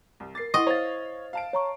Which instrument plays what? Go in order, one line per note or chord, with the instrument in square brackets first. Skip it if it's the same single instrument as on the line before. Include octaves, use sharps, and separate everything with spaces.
[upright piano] C2
[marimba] A#4 D6 [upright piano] A6 C7
[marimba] E4 F#5 G5 [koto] D#5 [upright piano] C6 C#6 [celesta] D#6
[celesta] C5 A6 [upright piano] C#5 F5
[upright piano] F5 A5 D7
[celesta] C#5 A#5 C#6